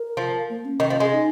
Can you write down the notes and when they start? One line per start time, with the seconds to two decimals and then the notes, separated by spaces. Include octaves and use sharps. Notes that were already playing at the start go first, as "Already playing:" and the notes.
Already playing: A#4
0.17 F3
0.49 A#3
0.65 C#4
0.80 D#3
0.90 F3
1.00 G#3
1.12 D#4